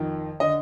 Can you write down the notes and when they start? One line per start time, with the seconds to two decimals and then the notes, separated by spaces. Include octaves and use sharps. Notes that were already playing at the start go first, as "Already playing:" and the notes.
Already playing: F2 D#3
0.40 D3 D#5